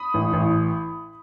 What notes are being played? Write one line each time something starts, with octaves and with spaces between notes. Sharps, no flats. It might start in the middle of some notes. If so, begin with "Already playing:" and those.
Already playing: B5 D#6
A1
A1